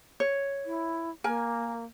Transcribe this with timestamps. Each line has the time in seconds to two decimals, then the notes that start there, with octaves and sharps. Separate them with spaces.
0.20 C#5
0.65 E4
1.24 A#3 A#4 G#5